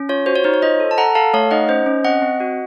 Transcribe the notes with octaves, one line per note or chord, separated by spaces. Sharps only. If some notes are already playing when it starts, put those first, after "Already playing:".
Already playing: C#4
F4 C#5
F#4 C5
C#5
D#4 C5
C#5
F4 C5 D#5
A4
A5
A4 F#5 A#5
A4 F5 A5
A3 C#5 F5
D#4 D#5 F#5
C#4 C5 D#5
C#4
C4 D#5 F#5
C4
F#4